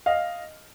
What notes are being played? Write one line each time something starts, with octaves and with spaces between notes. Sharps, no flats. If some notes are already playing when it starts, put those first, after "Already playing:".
D#5 F5